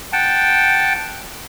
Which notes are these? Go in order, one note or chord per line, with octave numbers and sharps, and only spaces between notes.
F#5 G5 A5